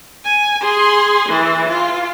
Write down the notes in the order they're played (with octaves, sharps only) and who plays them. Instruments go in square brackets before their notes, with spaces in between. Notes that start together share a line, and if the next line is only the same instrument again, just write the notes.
[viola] G#5
G#4 C6
E3
F4